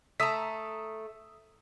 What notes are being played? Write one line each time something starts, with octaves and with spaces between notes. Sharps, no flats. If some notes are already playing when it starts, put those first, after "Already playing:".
A3 A#5 D#6 E6 B6